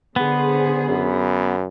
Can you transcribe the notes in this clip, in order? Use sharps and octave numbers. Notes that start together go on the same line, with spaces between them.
D3 B3 G#4 C5
F#2